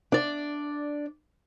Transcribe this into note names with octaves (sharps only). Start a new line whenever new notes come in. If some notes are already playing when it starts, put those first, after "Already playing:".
D4 D5